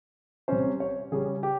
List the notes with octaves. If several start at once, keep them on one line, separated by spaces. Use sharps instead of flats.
C3 G3 C#4 C5
C#5
C#3 G3 C#4 G#4
G4